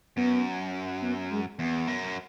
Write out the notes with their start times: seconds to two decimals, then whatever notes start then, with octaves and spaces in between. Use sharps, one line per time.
0.17 F#2 B3
1.03 B3
1.31 G#3
1.59 E2 B3
1.87 F#2